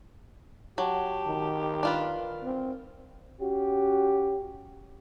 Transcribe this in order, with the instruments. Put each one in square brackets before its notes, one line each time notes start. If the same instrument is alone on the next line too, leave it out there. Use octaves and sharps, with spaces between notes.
[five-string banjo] F#3 [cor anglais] G4 [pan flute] A5
[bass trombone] D#3
[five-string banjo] D4 F4 B4 [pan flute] A#4
[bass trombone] C4
[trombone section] C#4 F#4 G4